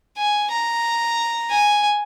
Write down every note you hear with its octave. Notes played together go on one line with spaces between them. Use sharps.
G#5
A#5
G#5